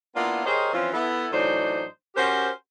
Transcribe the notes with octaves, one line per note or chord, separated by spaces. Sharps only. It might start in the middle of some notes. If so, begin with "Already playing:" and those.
A#3 B3 D4 E4 F4
G4 G#4 A#4 C5 C#5 D#5
E3 F3 C4 C#4 F4
B3 E4 A4
A2 E3 F#3 D4 D#4 C5
C#4 F#4 G4 A#4 C5